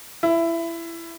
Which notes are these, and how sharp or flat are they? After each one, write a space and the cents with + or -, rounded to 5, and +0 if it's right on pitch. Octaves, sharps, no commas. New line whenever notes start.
E4 +20